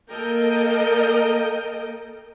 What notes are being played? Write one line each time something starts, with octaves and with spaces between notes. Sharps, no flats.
A#3 A4 A#4 D#5 G5